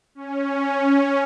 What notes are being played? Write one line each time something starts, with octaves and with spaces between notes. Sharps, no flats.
C#4